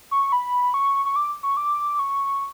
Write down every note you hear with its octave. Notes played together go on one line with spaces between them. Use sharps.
C#6
B5
C#6
C#6
D6
C#6
D6
C#6